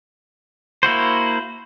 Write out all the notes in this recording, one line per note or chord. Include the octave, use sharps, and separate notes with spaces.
A#3 E4 F#4 C5